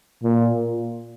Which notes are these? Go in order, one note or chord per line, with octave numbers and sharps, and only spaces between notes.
A#2